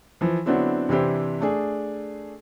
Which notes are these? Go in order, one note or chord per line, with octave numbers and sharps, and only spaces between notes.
E3 F3
D3 F#3 B3 C4 D4 E4
C3 E3 D4 E4 G4 C5
A3 D4 G#4